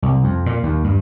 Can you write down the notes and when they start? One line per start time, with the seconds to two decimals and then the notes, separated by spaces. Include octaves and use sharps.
0.02 C2
0.24 F2
0.46 A#2
0.63 D#2
0.84 G2